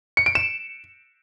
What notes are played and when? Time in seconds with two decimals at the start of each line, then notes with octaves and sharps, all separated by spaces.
0.17 C#7
0.26 D7
0.35 E7